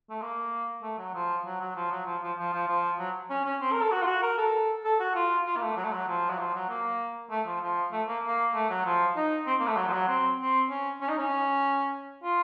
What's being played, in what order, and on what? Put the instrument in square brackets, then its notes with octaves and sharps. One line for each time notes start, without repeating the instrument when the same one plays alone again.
[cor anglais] A3
A#3
A3
F#3
F3
F#3
F#3
F3
F#3
F3
F3
F3
F3
F3
F#3
C#4
C#4
C4
A#4
A4
F#4
F4
F#4
A#4
A4
A4
F#4
F4
F4
A#3
A3
F#3
A3
F#3
F3
F#3
F3
F#3
A#3
A3
F3
F3
A3
A#3
A#3
A3
F#3
F3
D#4
C4
A#3
A3
F#3
F3
F#3
C4
C4
C#4
C#4
D#4
C#4
F4